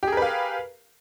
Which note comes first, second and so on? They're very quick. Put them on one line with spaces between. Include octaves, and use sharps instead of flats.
G4 G#4 A#4 B4 F5